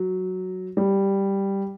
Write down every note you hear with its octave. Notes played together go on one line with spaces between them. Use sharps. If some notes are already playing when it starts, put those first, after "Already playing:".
Already playing: F#3
G3